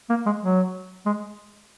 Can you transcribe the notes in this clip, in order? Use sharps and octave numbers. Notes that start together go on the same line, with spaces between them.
A#3
G#3
F#3
G#3